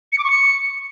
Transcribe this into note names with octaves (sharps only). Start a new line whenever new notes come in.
C#7
D6
C#6
C#7